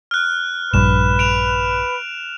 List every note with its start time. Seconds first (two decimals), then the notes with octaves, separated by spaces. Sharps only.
0.11 F6 F#6
0.74 A#1 G2 B4 E7
1.19 D7 E7 F7